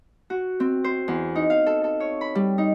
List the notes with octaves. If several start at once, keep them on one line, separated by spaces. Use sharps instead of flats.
F#4
C4
C5
E2
D#4
F5
A4
A4
C#5
B5
G3
D#4